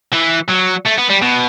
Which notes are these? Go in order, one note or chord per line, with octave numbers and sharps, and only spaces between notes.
E3
F#3
A3
B3
G3
B2